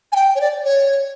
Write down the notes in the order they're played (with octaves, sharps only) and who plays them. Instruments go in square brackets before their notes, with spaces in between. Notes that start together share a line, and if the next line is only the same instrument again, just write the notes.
[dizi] G#5
G5
C#5
D5
C#5